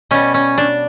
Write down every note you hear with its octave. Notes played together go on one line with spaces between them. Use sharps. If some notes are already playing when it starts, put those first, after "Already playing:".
B2 G3 C#4
C#4
D4